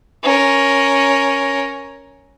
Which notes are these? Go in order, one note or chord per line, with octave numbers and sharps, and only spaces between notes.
C#4 A#4